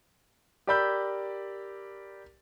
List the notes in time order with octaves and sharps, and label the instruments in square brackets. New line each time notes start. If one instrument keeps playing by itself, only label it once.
[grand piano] G4 A#4 D5 B5 E6 G6